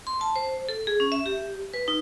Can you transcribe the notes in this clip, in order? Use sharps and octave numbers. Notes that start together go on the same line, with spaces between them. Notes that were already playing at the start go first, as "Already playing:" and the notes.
C6
A5
C5
A4
G#4
C#4
E5
G4
B4
D#4